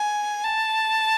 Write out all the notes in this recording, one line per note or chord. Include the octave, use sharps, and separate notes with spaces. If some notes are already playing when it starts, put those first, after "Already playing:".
Already playing: G#5
A5